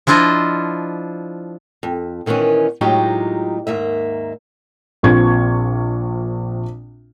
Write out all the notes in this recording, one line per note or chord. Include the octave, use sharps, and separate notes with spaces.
F3 D4 E4 F4 D#5
F2
A#2 D#3 E3 B3 C#4
A2 F#3 G#3 D#4 F4 G4
D#2 G#2 A#3 E5
A#1 C4 F4 C#6 G#6